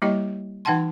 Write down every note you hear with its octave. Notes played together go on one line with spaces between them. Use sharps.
G3 A#3 E4 G4 D#5 G5
E3 D#4 F#5 G5 A5 C6